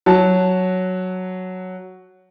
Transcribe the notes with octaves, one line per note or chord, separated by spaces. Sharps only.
F#3 A5